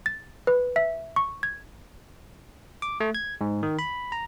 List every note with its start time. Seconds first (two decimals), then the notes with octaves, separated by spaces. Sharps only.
0.06 A6
0.47 B4
0.76 E5
1.16 C#6
1.43 G#6
2.82 D6
3.00 A3
3.15 G#6
3.41 G#2
3.63 D#3
3.79 B5
4.12 A#5